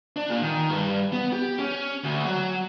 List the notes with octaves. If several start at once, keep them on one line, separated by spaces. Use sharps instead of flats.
D4
A#2
D#3
G2
B3
G4
C#4
D2
F#3